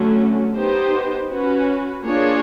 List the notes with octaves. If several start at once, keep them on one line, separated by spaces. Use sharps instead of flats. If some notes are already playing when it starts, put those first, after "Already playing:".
Already playing: D3 F#3 A3 C#4
B3 D#4 G4 C5
C#4 F#4 B4
A#3 D4 F4 G#4 C#5